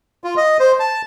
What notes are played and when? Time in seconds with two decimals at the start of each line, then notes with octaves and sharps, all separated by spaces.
0.24 F4
0.37 D#5
0.60 C5
0.80 A5